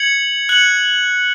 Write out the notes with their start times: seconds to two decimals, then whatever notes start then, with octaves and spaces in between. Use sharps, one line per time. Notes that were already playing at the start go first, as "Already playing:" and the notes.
Already playing: G#6 C#7 F#7
0.49 F#6 C#7 F#7